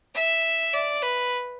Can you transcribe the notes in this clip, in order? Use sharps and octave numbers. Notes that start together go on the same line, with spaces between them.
E5
D5
B4